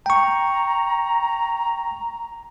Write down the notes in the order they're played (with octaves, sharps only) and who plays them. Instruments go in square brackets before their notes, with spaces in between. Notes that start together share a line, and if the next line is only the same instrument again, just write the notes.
[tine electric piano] G5 C#6 [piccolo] A#5